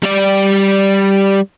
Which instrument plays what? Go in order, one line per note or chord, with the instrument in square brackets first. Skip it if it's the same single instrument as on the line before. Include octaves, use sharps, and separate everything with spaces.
[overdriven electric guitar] G3 D5